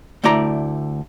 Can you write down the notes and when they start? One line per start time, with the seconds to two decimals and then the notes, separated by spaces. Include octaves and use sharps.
0.24 D2 A3 E4 D5 A#5